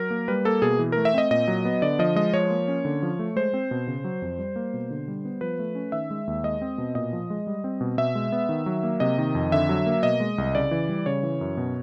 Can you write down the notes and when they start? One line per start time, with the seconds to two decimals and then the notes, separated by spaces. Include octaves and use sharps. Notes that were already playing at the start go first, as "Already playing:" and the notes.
Already playing: F#3 A#4
0.10 A#3
0.28 G3 B4
0.45 A#3 A4
0.62 B2 G#4
0.79 E3
0.92 A3 A#4
1.05 E5
1.14 C4 D#5
1.31 A#2 D#5
1.48 F#3
1.65 B3
1.82 D3 D5
1.99 F3 D#5
2.16 G#3 D#5
2.33 F3 C#5
2.50 A#3
2.68 C#4
2.85 D3
3.03 F3
3.19 A3
3.36 G#3 C5
3.54 C4
3.71 B2
3.87 C#3
4.04 F#3
4.22 F2
4.39 G3
4.56 A#3
4.74 B2
4.91 D3
5.08 G3
5.25 B3
5.41 F3 B4
5.59 A3
5.75 C#4
5.92 D#3 E5
6.11 G#3
6.27 D#2
6.44 G#3 D#5
6.61 C4
6.78 B2
6.95 A#2 D#5
7.13 F3
7.30 G#3
7.47 G3
7.64 C4
7.81 B2
7.98 B2 E5
8.15 G#3
8.32 B3
8.49 D#3
8.66 F#3
8.83 A#3
9.00 C3 D#5
9.18 D#3
9.35 F2
9.52 D3 E5
9.69 F#3
9.86 A#3
10.03 B2 D#5
10.20 G#3
10.38 C2
10.55 C#3 D5
10.71 E3
10.89 G3
11.06 C#3 C#5
11.23 E3
11.41 F#2
11.57 B2